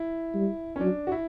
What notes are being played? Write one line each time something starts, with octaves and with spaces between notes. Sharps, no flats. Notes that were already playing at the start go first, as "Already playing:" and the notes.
Already playing: E4
G3
C#4
F#3 D4
F#4
E4